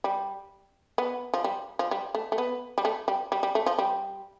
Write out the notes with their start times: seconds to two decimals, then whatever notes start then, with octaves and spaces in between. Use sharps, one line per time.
0.04 G3
0.98 B3
1.34 F3
1.44 G3
1.79 F3
1.91 G3
2.15 A3
2.32 A3
2.38 B3
2.78 G3
2.85 A3
3.08 G3
3.32 G3
3.43 G3
3.55 A3
3.66 F3
3.78 G3